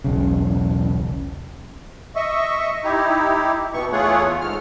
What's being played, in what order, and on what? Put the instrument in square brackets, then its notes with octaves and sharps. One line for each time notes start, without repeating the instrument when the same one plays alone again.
[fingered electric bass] E1 B1 C#3
[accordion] D#5 E5 C#6
D#4 E4 G4
B2 B3 C#6
E2 A3 F4 G#4 C#5 F#5
G#2 F6